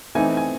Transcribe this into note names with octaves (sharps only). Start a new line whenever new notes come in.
E3 A3 C4 D#4 G#5
G#5